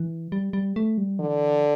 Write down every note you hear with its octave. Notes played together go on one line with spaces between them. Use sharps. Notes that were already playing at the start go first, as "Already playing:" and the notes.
Already playing: E3
G3
G3
A3
G3
D3 E3